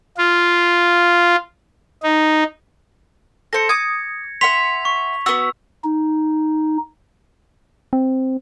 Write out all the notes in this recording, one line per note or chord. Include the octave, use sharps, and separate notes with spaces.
F4
D#4
A4 C5 A#6 C#7
D6 D#6 G#6
E5 F#5 C6 B6 F7
C#6
B3 F#4 E6
D#4
C4